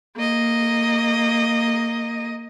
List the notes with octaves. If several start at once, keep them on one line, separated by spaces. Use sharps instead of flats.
A#3 D#5